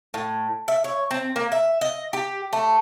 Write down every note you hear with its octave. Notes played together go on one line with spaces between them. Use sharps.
A2
E5
C#5
C4
A#3
E5
D#5
G4
A3